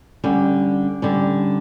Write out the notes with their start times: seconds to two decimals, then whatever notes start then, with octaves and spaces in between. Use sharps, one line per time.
0.24 D3 G3 C#4
1.02 D3 G3 C#4